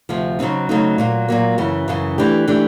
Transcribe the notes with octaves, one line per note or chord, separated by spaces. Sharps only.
D2 C3 F3
C#3 F#3 A3 C4 D#4
C#3 F#3 A3 C4 D#4
A#2 F#3 A#3
A#2 F#3 A#3
F#2 C#3 E3
F#2 C#3 E3
E3 A3 D4 G4
E3 A3 D4 G4